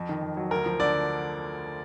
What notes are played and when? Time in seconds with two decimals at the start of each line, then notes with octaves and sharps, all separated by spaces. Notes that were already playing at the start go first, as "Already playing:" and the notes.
Already playing: F2
0.09 D#3
0.22 F2
0.37 F#3
0.51 D2 A#4
0.66 F3
0.80 D3 D5